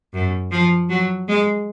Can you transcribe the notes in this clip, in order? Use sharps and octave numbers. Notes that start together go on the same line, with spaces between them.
F#2
F3
F#3
G#3